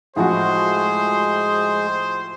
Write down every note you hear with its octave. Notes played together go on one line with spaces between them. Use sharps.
A2 F3 G#3 F#4 G#4 C5